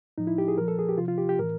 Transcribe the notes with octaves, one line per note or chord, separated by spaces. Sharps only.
A2 F3 D#4
E4
G4
G#4
A#2 F3 A#4
A4
G#4
G4
C3 F3 F4
F4
G4
G4
A2 E3 A#4